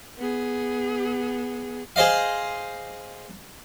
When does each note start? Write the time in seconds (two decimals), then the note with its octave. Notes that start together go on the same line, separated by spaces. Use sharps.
0.18 B3 G#4
1.96 G#4 C5 D#5 F5